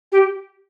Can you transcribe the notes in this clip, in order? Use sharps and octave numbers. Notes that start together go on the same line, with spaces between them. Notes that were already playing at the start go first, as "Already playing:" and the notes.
G4